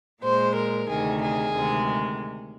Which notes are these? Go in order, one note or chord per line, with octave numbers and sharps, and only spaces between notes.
A#2 G#3 C5
A#4
D2 C3 D#3 G#4
G#4
D2 C3 D#3 G#3